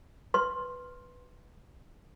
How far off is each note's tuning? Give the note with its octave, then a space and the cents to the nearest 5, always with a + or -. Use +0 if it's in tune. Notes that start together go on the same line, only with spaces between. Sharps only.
B4 +0 C6 +15